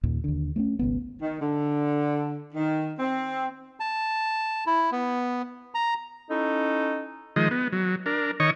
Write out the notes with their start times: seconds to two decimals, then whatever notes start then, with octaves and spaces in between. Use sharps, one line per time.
0.03 D#2 A#2 D#3
0.24 D#2 D3
0.56 A3 B3 C#4
0.79 G#1 C#2 B3
1.21 D#3
1.42 D3
2.55 D#3
3.00 C4
3.80 A5
4.67 E4
4.92 B3
5.74 A#5
6.31 C#4 D#4 E4 A4
7.36 D#3 F3 G#3 D#5
7.51 B3
7.72 F#3
8.06 D4 A#4
8.40 D#3 C#5 D#5 C#6